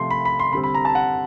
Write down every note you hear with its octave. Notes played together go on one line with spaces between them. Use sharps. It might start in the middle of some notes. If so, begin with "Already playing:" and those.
Already playing: C3 F3 A3 C6
B5
B5
C6
D3 G3 C4 B5
B5
A#5
A5
F#5